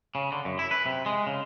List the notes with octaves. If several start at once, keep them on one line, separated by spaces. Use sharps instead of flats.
C#3
D3
F#2
E4
B4
C3
G#3
C#3